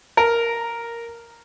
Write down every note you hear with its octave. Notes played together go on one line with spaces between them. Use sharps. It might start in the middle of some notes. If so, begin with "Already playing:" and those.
A#4